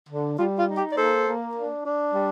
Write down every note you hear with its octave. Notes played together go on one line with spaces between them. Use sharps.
D3
G3 F4
F4
D#4
G4
D5
A#3 A4 C5
A#3
D4
D4
G3